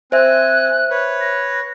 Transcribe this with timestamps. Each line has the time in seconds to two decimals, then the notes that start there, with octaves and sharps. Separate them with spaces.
0.12 C4 C5 E5 G#5 F#6
0.90 B4 C#5
1.21 A#6